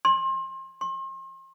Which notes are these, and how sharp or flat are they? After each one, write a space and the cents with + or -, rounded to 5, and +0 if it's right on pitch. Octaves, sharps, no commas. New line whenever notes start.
C6 +30
C6 +40